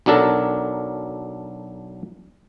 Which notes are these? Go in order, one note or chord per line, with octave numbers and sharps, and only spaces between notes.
B1 F#3 D4 A4 A#4